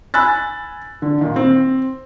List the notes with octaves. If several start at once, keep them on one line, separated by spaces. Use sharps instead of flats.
G#5 B5 E6 F#6 A6
D3
A#2 D#3
C4